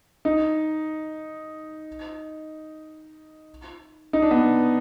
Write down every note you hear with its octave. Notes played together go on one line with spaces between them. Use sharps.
D#4
D#4
D4
B3